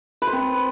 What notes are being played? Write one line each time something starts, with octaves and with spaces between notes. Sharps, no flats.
B4
C5
C4